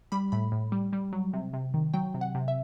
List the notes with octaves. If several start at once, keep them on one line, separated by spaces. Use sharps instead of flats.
G3 B5
A2 B5
A2
G3
G3
F#3
C3
C3
D#3
F#3 G5
C3
F#5
C3
E5